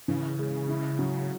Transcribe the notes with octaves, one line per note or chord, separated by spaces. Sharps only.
C#3 E3
G#3
E4
F#3